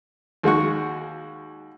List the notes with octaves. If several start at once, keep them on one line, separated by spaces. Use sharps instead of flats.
D#2 G#3 F#4 C#6